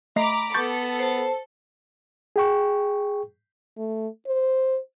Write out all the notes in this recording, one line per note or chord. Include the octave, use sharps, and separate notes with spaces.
A3 D#5 A#5 B5 D6 C7
B3 A4 C#6 G6 A6
C5 A5
G#4 G5 C#6
A3
C5